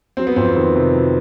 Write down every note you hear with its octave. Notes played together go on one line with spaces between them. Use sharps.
F#3 C4
B3
F2 C4
B3
D#3 C4
C3
F#3